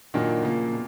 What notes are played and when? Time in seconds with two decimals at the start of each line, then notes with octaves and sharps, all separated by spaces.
0.14 A#2 D#3 F#3 A#3 D4
0.43 C#3 F3 A#3
0.72 B2